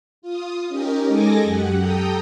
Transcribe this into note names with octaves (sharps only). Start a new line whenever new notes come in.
F4 D#6
C#4 D#4 G4 A#4
G#3 A4 D#5 G#5 D6 A#6
F#2 G4 F#5
G4 A4 G5 A#5 D#6